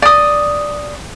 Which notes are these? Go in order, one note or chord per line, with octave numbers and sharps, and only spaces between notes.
D5 D#6